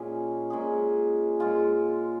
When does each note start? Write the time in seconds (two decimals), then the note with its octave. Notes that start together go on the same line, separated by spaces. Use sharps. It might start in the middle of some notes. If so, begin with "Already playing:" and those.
Already playing: A#2 G#3 C#4 G#4
0.50 A#2 G#3 C#4 G#4
1.39 A#2 G#3 F4 G#4